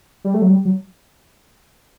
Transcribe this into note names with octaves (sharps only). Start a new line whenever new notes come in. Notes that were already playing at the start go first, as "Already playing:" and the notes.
G3
A3
F#3
G3
F#3